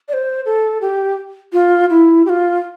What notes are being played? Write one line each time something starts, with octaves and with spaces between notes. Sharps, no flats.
D5
C5
A4
G4
F4
E4
G4
F4